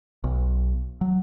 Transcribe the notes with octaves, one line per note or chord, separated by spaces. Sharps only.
B1
F#3